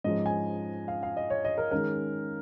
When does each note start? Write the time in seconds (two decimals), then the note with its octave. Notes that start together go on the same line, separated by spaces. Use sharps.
0.04 G#2 F3 C#4 D#5
0.26 G#5
0.88 F5
1.03 F5
1.17 D#5
1.30 C#5
1.45 D#5
1.58 A#4
1.71 D#3 G#3 C#4 A#4